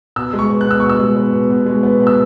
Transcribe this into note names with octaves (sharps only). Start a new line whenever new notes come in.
B2 E6
G#3
C#6
B3
F#6
B2 E6
B2 C#6
E6
G#3
B3
B2
B2
G#3
B3
B2
E6